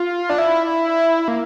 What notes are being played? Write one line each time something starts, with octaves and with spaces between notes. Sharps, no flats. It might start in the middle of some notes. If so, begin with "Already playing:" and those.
Already playing: F4
D4
E4
A#3